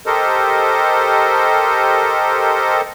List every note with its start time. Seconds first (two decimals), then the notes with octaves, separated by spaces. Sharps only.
0.06 G4 A4 A#4 C5 D#5